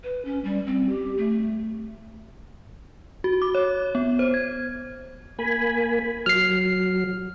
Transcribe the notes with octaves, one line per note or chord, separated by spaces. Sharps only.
B4
C#4
G3
C4
G4
A3
F#4
D6
C#5
B3
C5
G#6
A#3 G#5 B5
F#3 F6 C7